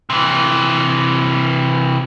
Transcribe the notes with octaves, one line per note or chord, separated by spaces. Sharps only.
C3 E3